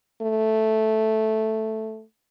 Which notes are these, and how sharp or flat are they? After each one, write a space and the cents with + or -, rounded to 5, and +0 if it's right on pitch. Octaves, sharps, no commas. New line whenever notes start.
A3 -5